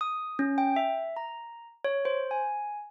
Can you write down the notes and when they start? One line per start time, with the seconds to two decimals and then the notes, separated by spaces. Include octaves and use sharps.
0.01 D#6
0.39 C#4
0.58 G5
0.76 E5
1.17 A#5
1.84 C#5
2.05 C5
2.31 G#5